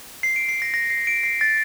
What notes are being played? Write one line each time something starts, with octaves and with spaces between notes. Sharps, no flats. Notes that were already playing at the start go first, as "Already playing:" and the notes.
C7
D7
C7
A#6
A#6
C7
D7
C7
A6